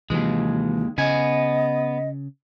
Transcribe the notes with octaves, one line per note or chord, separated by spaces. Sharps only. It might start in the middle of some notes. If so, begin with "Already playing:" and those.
D#2 C3 E3 F#3 G#3
C#3 B3 D#5 G#5